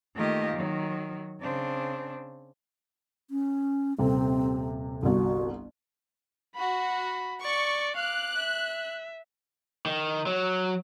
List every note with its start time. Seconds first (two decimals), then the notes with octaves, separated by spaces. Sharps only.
0.15 D#3 A3 A#3 F4 G4 D#5
0.54 D#3 F#3
1.41 C#3 C4 D4
3.30 C#4
3.98 D#1 C3 C4 A4
5.03 G1 C2 F#4
6.56 F#4 B5
7.42 D5 C#6
7.97 F5 D6 F#6
8.38 E5
9.86 D#3
10.26 F#3